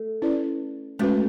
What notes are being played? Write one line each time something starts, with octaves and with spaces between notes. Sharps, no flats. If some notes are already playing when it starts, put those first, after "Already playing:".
Already playing: A3
C#4 E4 B4 D5
G#3 A3 C#4 F#4 B4